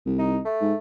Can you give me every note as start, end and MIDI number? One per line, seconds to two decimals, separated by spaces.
0.06 0.39 36
0.19 0.38 63
0.45 0.78 57
0.61 0.74 44